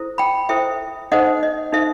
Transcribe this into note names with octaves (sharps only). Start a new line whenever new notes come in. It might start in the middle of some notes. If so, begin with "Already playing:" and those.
Already playing: E4 A4 C5
G5 B5
E4 A4 C5 E5 G5
D#4 A4 C5 D#5 F#5
D#5
D#4 A4 C5 E5